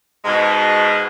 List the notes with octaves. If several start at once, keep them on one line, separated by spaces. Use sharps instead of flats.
G#2 B2 G#3